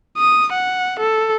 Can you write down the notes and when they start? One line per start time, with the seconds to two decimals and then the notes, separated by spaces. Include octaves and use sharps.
0.17 D#6
0.52 F#5
1.00 A4